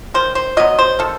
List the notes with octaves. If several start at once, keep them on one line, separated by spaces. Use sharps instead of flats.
D#3 C5
C5
F#3 B3 D#5
C5
D#3 A4